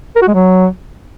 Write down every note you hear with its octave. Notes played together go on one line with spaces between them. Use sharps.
A#4
F#4
G#3
F#3